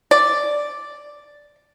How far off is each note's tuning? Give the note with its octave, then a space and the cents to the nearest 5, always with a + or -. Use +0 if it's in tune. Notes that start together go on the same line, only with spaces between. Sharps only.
D5 +0